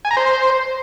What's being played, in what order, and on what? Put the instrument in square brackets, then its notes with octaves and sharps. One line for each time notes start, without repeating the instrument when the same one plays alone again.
[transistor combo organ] G#5
A#5
C5